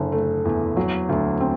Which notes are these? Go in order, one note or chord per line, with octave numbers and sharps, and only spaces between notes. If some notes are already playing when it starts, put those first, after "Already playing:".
Already playing: F#1 D3
A3
E2
F#3
D2
C4